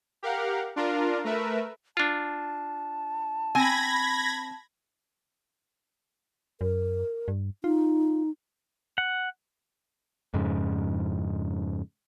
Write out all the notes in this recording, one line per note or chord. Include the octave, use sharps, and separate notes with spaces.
G4 A#4 F5 F#5
D4 F4 A#4
A3 A#4 B4 E5
D4 F4 A5
C4 G#5 B5 G#6 A#6
F#2 A#4
G2
D#4 F4
F#5
F2 G#2 C#3